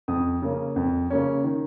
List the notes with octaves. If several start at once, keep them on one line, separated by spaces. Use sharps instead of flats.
F2 D#6
C#3 A#3 C#4
F2
C#3 A#3 C#4
D#3